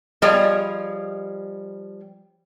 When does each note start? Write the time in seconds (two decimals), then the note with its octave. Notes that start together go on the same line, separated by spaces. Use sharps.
0.22 F3 G3 G#4 C#5 D#5